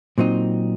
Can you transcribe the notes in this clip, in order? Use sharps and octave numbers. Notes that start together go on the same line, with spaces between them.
A#2 F#3 C4 D#4